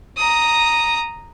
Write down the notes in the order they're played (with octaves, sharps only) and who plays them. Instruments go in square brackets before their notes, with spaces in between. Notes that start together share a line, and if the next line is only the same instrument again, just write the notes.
[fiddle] A#5 D#6